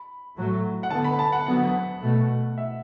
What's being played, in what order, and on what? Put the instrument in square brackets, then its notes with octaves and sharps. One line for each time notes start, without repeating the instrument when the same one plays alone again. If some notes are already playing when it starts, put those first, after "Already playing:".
Already playing: [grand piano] B5
[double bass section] A2 F#3 A3
[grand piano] F#5
[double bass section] D3 B3 [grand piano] A5
[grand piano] B5
A5
F#5
[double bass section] D3 F#3 B3 [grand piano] F#5
[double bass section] B2 A3
[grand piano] E5